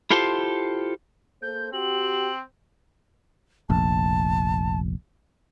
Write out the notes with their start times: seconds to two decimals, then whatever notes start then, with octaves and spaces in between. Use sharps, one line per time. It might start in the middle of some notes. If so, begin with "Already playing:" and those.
0.10 E4 F4 G4 A4 C5 C6
1.42 A#3 A4 C5 G6
1.73 C4 F#4 G4 F#7
3.70 F1 A#1 A5